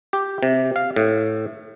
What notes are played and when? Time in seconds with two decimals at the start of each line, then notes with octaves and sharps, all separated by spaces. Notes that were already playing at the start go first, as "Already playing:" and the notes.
0.13 G4
0.43 C3
0.76 F5
0.96 A2